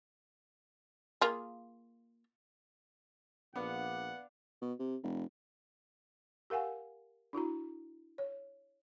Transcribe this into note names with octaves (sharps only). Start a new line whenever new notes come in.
A#3 F4 G#4
A#1 B3 D4 F5 F#5
B2
C3
F1
G4 A#4 F5 F#5 G#5
D4 E4 F#4 A#5
C#5